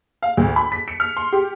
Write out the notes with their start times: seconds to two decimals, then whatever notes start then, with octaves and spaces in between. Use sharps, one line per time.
0.22 F5
0.37 D2
0.56 B5
0.72 B6
0.88 C#7
1.00 F6
1.17 C6
1.32 G4